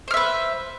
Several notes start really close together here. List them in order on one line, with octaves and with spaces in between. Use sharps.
C5 F6 E5 B4